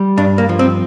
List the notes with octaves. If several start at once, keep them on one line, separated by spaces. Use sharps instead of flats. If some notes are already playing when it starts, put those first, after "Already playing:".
Already playing: G3
G2 D4
A#3
F3
C4